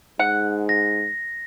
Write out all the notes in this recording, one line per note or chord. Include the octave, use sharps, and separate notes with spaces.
G#2 F#5
A#6